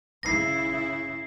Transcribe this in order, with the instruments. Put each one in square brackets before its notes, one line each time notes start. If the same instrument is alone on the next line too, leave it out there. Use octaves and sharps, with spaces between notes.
[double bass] C#3 E4 [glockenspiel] A#6 C7